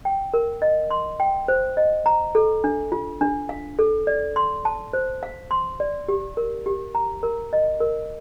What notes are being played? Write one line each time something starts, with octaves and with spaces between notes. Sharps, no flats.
G5
A#4
D#5
C6
G5
C5
D#5
A#5
A4
D4
F4
D4
F5
A4
D5
C6
A5
C5
F5
C6
D5
G4
A#4
G4
A#5
A#4
D#5
A#4